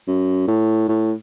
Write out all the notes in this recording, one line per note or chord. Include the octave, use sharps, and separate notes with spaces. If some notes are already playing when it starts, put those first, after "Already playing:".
F#2
A2
A2